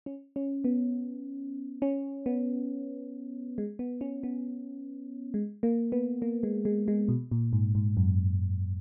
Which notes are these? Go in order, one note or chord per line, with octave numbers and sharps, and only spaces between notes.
C#4
C#4
B3
C#4
B3
G#3
B3
C#4
B3
G#3
A#3
B3
A#3
G#3
G#3
G#3
B2
A#2
G#2
G#2
F#2